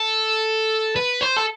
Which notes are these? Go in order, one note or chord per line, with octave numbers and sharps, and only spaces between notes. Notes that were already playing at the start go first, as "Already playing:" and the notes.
Already playing: A4
B4
C5
A4